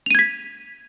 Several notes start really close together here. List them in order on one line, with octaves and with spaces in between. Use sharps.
F7 D#7 G#6 B6